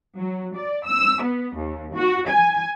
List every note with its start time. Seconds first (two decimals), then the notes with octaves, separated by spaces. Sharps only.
0.16 F#3
0.55 D5
0.86 E6
1.22 B3
1.55 D#2
1.94 F#4
2.28 G#5